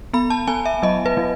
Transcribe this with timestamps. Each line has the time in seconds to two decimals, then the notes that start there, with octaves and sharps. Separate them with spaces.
0.13 B3 B5
0.30 A5
0.47 B3 G#5
0.66 E5
0.83 F#3 D#5
1.06 B4
1.17 F#3